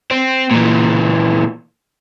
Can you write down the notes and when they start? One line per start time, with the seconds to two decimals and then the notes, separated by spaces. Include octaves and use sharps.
0.11 C4
0.51 A#2 E3